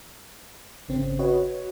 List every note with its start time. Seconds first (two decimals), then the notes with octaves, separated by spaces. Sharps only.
0.89 G#1 C#3 C4 C#4
1.19 F#4 B4 C#5 D#5 F#5